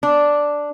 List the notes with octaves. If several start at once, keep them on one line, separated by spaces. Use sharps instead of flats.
D4